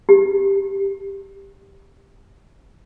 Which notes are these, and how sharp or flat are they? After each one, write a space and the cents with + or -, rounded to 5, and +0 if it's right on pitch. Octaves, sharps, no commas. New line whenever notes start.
G4 +0